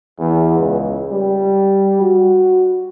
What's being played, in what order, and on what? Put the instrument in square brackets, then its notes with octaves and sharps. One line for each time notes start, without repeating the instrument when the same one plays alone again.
[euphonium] E2
C#2
G3
F#4